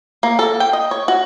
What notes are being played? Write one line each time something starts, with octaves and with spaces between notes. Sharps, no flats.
A#3
A4
G5
D#5
C#5
F#4